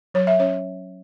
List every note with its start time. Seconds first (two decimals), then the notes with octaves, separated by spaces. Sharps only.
0.14 F#3 C#5
0.27 E5
0.39 C#4 C#5